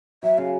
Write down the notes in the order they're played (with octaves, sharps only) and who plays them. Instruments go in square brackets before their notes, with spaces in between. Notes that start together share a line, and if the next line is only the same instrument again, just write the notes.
[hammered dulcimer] F#3 [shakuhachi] E5
[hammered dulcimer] C#3 [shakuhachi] F5